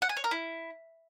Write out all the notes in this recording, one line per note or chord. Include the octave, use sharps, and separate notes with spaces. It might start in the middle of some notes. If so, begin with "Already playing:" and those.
F#5
G#5
C#5
A#4
E4